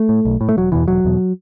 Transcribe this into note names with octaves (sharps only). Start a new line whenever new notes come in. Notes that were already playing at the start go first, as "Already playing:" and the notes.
Already playing: A3
A2
B1
A2
A3
E1 F#3
E2 B2 E3
E1 F#3
E2 B2